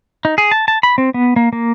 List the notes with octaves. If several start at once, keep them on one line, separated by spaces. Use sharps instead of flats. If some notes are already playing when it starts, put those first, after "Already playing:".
D#4
G#4
A5
A5
B5
C4
B3
A#3
A#3